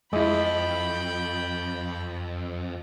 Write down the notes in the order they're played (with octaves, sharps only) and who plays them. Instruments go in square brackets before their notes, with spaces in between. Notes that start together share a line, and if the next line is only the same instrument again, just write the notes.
[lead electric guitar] F2 [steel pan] G#3 E4 [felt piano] D#5 [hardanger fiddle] G5 B5